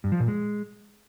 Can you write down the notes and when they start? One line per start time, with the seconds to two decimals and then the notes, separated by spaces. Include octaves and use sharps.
0.04 G2
0.12 F3
0.20 A#2
0.28 G#3